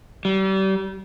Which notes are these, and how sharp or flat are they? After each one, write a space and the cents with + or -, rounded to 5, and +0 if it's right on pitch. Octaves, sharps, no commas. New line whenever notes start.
G3 -35